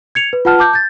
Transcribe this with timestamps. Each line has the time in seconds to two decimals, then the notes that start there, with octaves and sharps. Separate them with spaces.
0.15 G#6 C#7 F7
0.33 B4
0.45 F4 B4 F#5 A5 F6
0.59 A5 D6 G6
0.73 G6 A6